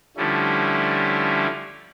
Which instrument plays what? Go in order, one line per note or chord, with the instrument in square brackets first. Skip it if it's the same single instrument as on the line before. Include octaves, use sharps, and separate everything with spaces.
[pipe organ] D3 F3 G3 A3 C#4 E4